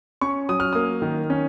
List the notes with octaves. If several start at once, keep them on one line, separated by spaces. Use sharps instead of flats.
C#4 C#6
F#3 D#6
F6
A#3 D#6
D#3
C#4